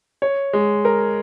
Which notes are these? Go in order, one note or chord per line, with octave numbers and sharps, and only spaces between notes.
C#5
G#3
A#4